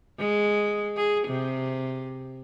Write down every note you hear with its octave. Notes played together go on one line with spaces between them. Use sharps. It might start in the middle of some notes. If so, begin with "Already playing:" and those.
G#3
G#4
C3